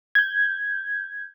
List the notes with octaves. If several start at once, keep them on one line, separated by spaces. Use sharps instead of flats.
G6 G#6